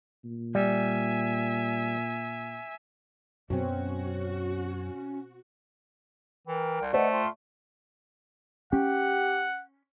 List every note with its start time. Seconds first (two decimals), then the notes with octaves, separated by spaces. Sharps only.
0.24 A#2
0.55 G3 E5 G#5
3.50 F#2 B2 F#3 C4 C#4 F#4
6.48 E3 A#4 G5
6.81 C2
6.93 A3 B4 C5 D5 D#5 F#5
7.12 F4 G5 C6
8.73 C#4 G4 F#5